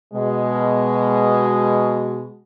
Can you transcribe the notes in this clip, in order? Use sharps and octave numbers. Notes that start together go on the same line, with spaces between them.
B2 G#3